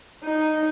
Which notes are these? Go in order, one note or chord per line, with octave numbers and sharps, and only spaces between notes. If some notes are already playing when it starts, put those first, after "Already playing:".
D#4